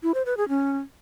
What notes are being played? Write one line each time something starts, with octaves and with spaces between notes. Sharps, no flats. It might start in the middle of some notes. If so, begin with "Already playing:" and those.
E4
C5
B4
G#4
C#4